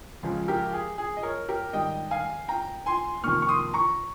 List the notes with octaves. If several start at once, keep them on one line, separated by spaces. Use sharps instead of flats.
C#2 C#3 F3 G#3
G4 A#4
G#4
G#4
D#5
A#4 C#5
G4 A#4
G#2 D#3 G3 D#5 G5
F5 G#5
G5 A#5
G#5 C6
F2 C3 D#3 A#3 C#6 F6
C#6
C6 D#6
A#5 C#6